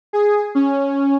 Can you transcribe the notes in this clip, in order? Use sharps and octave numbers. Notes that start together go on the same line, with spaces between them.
G#4
C#4